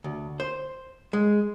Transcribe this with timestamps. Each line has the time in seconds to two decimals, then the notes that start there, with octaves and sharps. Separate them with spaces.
0.04 D2
0.40 C5
1.13 G#3